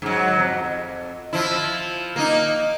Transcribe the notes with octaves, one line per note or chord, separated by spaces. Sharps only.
G#2 F#3
F2
F3 E4
A#3 D#4